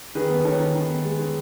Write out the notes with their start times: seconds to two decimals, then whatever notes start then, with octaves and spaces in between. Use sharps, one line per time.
0.15 D#3 G#4 B4
0.30 B3
0.45 D#3 A4 C#5
0.59 D#3
0.75 D#3
0.90 B3
1.05 G#3
1.19 D#3